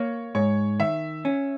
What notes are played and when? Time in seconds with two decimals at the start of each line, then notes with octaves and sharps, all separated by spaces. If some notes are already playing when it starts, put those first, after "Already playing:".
Already playing: A#3 C#5
0.35 G#2 C#5
0.80 D#3 E5
1.25 C#4